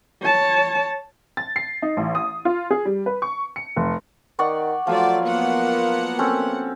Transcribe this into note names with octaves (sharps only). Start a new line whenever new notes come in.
C#5 A5
A6
C7
D#4
A1
D#6
F4
G#4
G3
B4
C#6
C#7
F1
D#3 D5 F#5 C#6
F3 F#3 A3 F4 D5
A#3 B3 F#5
C4 C#4 A4